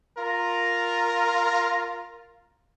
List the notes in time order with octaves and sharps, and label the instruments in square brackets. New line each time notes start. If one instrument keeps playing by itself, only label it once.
[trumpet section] F4 A#4 A#5